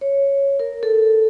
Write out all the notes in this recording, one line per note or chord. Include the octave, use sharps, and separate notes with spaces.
C#5
A#4
A4